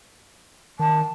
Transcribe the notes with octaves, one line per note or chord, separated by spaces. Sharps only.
D#3 A5